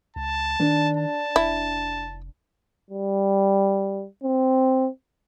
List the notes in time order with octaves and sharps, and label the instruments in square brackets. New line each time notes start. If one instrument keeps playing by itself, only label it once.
[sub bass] C#2 [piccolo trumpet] A5
[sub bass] D#3 [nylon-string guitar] D4
[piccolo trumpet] A5
[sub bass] F1 [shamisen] E4
[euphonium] G3
C4